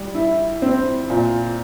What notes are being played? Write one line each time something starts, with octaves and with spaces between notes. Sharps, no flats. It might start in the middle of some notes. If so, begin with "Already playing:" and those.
Already playing: G3
E4
C4
A#2